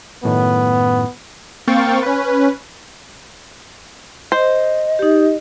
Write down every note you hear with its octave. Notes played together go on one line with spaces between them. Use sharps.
F#2 A2 D#3 B3
A#3 C4 F5 G5 C#6 A6
C#4 B4
C5 D#5
D#4 G4